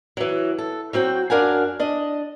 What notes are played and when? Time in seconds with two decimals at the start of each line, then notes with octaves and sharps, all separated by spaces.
0.17 E3 F#3
0.58 A4
0.93 F#3 C4 F#4 G5
1.30 F#2 D4 A#4 F5 F#5 G#5
1.79 D4 D#5